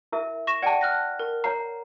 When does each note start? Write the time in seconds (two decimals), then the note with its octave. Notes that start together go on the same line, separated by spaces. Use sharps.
0.12 E4 A#4 E5
0.47 C#6 A#6 E7
0.62 D5 F#5 G5 A5
0.81 F6 F#6 A#6
1.20 A#4
1.44 C#5 F#5 A#5 C7